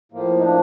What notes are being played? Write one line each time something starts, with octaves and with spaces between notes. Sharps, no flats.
A2 F3 A#3
D#4
D4